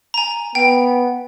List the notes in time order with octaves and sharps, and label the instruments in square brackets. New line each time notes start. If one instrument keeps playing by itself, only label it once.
[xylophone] G#5 A#5
[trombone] B3 [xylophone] G5